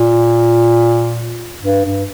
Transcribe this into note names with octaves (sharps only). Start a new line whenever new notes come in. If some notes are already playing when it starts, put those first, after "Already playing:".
Already playing: A#2
G2
G2